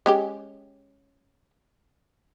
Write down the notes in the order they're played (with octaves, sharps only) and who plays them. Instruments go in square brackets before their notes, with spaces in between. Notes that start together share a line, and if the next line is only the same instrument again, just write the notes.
[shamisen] G#3 C#4 G4